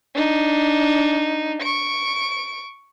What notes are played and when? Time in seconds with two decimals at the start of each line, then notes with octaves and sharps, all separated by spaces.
0.15 D4 D#4
1.62 C#6 D7